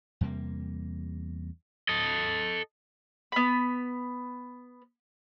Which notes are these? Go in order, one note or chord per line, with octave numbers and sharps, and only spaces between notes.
E2 C3 G3 A#3
A4 D#5
B3 B5